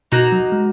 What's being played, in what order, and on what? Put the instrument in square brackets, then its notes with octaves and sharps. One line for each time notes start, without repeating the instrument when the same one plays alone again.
[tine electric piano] B2 [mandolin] A#3 D#4 F#4
[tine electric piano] F#3
G#3